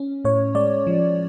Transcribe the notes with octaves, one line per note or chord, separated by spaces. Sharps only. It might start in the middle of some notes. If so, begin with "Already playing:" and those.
Already playing: C#4
A2 C#5
G#3 D5
F3